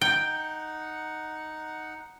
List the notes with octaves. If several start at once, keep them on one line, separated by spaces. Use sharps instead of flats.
D#4 F#5 G5